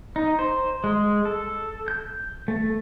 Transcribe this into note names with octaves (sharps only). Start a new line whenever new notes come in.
D#4
C5
G#3
A4
G6
A3